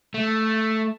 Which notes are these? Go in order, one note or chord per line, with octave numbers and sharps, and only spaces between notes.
A3